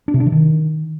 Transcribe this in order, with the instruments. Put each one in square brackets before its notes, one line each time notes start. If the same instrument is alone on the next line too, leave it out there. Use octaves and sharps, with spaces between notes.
[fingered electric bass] D4
C3
D4
E3
D#3